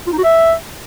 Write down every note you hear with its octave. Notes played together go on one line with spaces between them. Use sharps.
F4
D#4
F#4
E5